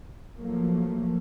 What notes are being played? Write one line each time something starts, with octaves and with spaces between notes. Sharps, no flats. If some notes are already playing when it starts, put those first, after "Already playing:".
F3 F#3 A3 A#3